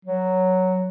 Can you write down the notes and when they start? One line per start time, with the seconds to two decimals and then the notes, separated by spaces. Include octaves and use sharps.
0.05 F#3